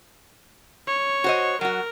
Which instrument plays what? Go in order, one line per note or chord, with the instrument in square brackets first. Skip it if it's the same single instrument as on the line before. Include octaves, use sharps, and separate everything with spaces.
[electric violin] C#5
[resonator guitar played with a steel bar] F#4 C5 D#5
[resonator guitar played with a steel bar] F#3 F#4 [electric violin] A#4